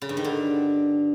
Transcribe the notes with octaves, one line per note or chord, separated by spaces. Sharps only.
C#3
G2
D#3
D3